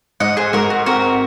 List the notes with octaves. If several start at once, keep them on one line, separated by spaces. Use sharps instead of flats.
G#2 D#5 F#5
G#4 C5
G#2 F#4 A#4
F#4
C4 F#4 A#4